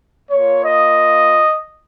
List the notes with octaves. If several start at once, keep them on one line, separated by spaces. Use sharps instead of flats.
A#3 F4 C#5
D#5